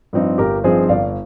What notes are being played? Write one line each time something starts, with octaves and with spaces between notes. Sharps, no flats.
G2 F3 C4 D#4
G1 G4 A#4
G2 F3 C4 D#4 G#4 C5
G1 D5 F5